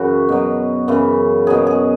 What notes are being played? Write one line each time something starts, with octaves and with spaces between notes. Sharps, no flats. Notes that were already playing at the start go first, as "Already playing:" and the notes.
Already playing: F#2 C#3 E3 F#4
B2 F#3
F#2 C#3 E3
B2 F#3 G#4
G#4